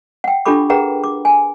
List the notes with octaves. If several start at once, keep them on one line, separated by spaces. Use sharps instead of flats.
F#5 G5
D4 F4 G4 A4 B5 D6
G#4 A#4 B4 F#5 G5 A#5
D6
G#5